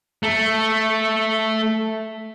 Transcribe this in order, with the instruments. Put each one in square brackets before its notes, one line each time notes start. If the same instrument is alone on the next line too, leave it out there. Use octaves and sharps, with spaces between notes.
[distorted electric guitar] A3